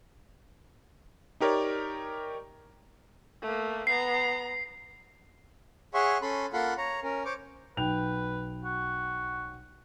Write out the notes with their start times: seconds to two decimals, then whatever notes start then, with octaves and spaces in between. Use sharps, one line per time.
1.40 D#4 G4 A#4 C#5 D5
3.43 A3 A#3
3.87 B3 A#5 C7
5.94 G#4 C#5 E5 F#5 C6 C#6
6.22 C#4 A4 B5 C6
6.53 A#3 F4 A4 F#5 B5 C6
6.78 C#5 A#5
7.03 C#4 A#4
7.25 C5 C#5 D6
7.77 B1 B4 G5 F7
8.65 F#4